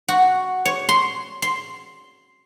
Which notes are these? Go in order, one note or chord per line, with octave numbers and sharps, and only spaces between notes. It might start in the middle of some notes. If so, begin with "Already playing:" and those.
F#4
C#5
C6
C6